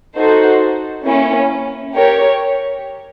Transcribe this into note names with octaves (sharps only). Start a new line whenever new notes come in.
D#4 F#4 A4 C5
A#3 C#4 E4
G4 A#4 C#5